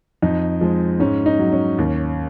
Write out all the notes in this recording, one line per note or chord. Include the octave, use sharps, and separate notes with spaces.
F2 D#4
F3 G#3
G#2 C#4
D#4
F#3
C#4
D#2